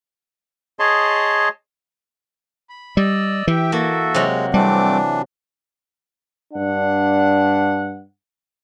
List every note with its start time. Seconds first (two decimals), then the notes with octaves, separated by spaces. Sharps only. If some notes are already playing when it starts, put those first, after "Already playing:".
0.79 G#4 C#5 D#5 A5 C6
2.69 B5
2.97 G3 D5 D#5 E6
3.47 E3 G4 E5 G5
3.72 A#3 F#4 A4 E5
4.14 C3 F#3 G#3
4.54 E3 G3 A3 C4 D4 D6
6.54 G2 D4 F#5